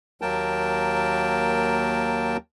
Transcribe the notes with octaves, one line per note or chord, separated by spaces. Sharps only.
D#2 F#3 A#3 A#4 G5 A5